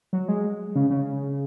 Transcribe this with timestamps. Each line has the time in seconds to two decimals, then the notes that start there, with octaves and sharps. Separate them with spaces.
0.13 F#3
0.28 G#3
0.75 C#3
0.91 C#3